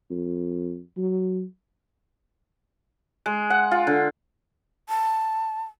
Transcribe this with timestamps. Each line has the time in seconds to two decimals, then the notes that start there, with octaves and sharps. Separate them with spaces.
0.11 F2
0.97 F#3
3.26 G#3
3.50 F#5
3.71 F4
3.87 D3
4.89 A5